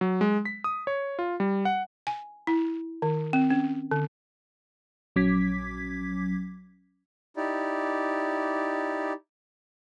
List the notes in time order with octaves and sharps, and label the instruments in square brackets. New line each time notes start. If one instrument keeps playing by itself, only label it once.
[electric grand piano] F#3
G#3
B6
D#6
C#5
F4
G3
F#5
[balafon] G#5
E4
D#3
C4
C#4
D3
[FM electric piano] A#1 F#3 C#4 D6 G#6 B6
[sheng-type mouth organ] D#4 E4 G4 D5